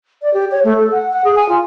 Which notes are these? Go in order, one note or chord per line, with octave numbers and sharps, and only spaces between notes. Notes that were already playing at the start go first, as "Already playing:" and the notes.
D5
G4
C#5
A3
A4
F#5
F#5
G#4
G#5
F4